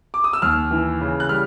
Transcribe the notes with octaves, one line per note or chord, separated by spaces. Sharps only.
D6
D#6
E6
D#2 F6
E3
C#3
F#6
G3 F6